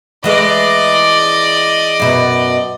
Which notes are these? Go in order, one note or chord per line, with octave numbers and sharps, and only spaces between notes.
E3 G#3 A3 D5 D#5
F#2 B2